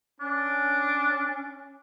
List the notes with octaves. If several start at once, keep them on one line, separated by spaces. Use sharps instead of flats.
C#4 D4